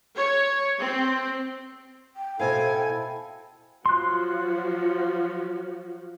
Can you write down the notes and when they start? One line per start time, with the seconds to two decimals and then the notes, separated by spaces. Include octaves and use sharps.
0.17 C#5
0.80 C4
2.17 G5
2.40 B2 E4 A4 C5 F5 G#5
3.86 F3 F#3 F#4 C6 F#6